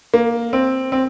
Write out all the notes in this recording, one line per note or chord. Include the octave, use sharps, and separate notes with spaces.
A#3
C4
C4